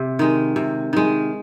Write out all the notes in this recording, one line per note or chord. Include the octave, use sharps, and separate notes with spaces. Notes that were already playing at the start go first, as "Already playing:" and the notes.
Already playing: C3
D#3 G#3
C3
D#3 G#3